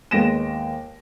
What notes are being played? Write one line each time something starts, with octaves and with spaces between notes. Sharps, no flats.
D#2 G#3 B3 A#6 D7 E7